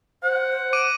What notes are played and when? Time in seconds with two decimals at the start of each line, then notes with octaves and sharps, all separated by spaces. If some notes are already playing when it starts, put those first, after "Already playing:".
0.23 C5 F#5
0.73 D6 D7 D#7